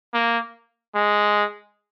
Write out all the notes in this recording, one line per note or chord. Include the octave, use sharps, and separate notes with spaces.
A#3
G#3